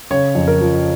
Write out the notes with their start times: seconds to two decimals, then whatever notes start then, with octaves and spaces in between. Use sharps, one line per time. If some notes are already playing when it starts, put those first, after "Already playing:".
0.11 C#3 C#5
0.35 F2
0.47 A#4
0.61 F3